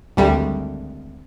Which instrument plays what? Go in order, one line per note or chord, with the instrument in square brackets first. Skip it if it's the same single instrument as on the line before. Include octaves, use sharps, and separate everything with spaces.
[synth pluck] G#1 D2 G3